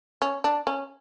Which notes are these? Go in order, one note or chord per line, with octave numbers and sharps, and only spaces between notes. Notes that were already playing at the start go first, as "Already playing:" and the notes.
C#4
D4
C#4